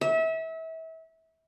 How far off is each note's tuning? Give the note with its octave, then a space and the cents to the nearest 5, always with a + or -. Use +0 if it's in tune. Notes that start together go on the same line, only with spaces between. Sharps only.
E5 -30